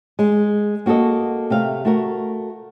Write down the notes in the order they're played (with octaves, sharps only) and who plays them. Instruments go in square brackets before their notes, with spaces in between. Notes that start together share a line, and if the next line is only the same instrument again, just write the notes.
[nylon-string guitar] G#3
A#3 F#4 G#4 A4 D#5
C3 A3 F5
A3 F#4 A#4